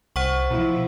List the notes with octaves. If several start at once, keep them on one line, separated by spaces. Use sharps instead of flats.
C2 C5 F#5 C#6
B2 F3 E4